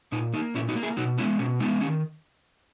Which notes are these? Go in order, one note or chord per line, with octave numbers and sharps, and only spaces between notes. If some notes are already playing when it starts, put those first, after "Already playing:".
A#2 D#4
A#3 D#4
A#2 C#4 E4
D#4 F#4
A#3
E4 G#4
B2 D#4 F#4
G#3 B3 C#4 E4
B2 C#4
G#3 B3 D#4
D#3 C#4